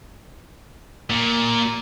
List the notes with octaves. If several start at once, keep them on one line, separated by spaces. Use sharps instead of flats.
A#2